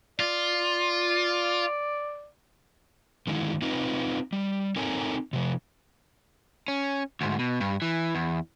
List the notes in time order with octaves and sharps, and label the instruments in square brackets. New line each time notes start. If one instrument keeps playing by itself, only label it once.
[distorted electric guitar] F4 [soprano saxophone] D5
[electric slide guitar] D3 D#3 G#3 E4
C4 D#4 F4 B4
G3
C4 D#4 A4 A#4 C#5 G#5
C3 F3
[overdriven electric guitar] C#4
D2 G#2
B2
G2
E3
E2